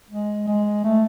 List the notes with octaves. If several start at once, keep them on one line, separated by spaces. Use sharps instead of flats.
G#3
G#3
A3